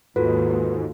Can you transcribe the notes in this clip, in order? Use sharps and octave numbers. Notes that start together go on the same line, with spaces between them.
D#2 G#2 F4 F#4 A4 B4